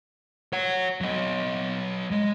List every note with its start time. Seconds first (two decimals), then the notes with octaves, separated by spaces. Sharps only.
0.53 C#5 F#5
1.01 F#3 D#5
2.11 G#3